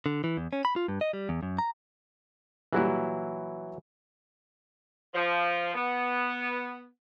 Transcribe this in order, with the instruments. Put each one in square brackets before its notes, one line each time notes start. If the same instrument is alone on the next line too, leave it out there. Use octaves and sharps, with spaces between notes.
[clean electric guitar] D3
E3
E2
C#4
B5
F4
G2
D#5
G3
E2
F#2
A#5
[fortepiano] A#2 G3 F#6 [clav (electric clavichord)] E3 F#3 E4
[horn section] F3
B3